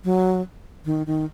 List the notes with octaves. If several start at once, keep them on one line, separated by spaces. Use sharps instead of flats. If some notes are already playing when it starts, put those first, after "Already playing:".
F#3
D#3
D#3